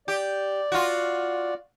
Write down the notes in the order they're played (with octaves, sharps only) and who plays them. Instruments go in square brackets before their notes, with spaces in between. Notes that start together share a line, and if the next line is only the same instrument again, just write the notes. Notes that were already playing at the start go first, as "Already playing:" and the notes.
[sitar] G4 [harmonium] D5
[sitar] F4 F#4